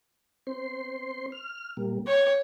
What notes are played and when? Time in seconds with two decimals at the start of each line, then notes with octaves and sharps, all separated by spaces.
0.47 C4 C5 C6
1.32 F6
1.77 A#2 G3 A#3
2.07 C#5 G5